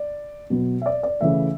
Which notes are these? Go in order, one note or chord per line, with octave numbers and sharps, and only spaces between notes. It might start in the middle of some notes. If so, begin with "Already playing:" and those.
Already playing: D5
B2 F#3 B3
E5
D5
D5
C#3 E3 A3 E5